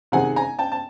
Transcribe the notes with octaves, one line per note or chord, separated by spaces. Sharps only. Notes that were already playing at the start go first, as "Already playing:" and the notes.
C3 D#3 G#3 F#5 G#5
G#5 A#5
G5 A5
A5